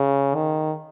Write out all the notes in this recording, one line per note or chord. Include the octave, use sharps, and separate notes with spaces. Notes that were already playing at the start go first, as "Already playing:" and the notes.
Already playing: C#3
D#3